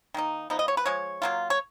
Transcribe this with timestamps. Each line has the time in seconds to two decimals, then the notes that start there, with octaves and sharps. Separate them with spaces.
0.14 D#3 A#3 D#4
0.50 F3 B3 D#4
0.59 D#5
0.68 C#5
0.77 B4
0.86 F3 G#3 C#5
1.22 F#3 A#3 F4
1.50 C#5